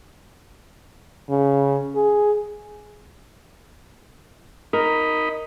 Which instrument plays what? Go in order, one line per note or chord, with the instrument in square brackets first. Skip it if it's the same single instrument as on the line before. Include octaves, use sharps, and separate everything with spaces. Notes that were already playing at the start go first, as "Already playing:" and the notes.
[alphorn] C#3
G#4
[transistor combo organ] D#4 D#5 B5 [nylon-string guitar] A#4